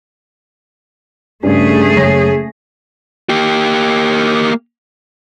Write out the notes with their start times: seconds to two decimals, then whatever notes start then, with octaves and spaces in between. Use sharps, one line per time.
1.43 G2 C#3 A3 G#4
1.96 F#1 C#5 A#6
3.29 A#3 G4